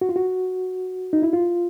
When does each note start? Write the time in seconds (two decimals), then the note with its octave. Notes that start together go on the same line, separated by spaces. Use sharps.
0.01 F#4
0.09 F4
0.16 F#4
1.13 D#4
1.22 E4
1.33 F4